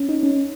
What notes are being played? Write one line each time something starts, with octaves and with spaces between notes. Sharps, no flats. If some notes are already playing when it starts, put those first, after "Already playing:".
Already playing: C#4
D#4
C#4